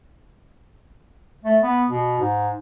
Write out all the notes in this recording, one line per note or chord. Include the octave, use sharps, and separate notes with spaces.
A3
B3
B2
G#2